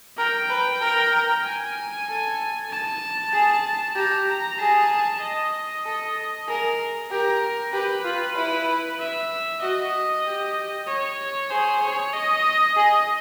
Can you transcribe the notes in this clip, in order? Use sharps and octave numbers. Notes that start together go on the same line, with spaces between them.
A#4 G5
B4
A#4
G#5
A4
A5
G#4
G4 A#5
A#5
G#4 A5
D#5
A4
G#4 A#4
G4 A#4
G4 B4
F4
E4
E5
F#4 D#5
G4
C#5
G#4 C5
C#5
D#5
G#4 D#5